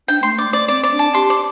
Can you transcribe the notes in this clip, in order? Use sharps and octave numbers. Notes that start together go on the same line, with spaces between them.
D4 G5
A3 C6
D5
A3
D5
C4 D5
D5
D4
A5
G4 C6
D5